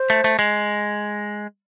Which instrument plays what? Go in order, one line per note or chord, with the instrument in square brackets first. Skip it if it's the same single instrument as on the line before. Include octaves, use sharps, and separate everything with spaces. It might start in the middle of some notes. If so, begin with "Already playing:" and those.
Already playing: [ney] C5
[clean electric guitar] A3
A3
G#3